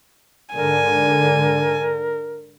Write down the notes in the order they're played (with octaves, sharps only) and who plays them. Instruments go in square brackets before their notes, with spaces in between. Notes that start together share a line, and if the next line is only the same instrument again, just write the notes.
[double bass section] G#2 D3 [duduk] A#4 [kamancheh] G#5